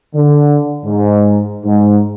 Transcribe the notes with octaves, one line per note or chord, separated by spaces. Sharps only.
D3
G#2
G#2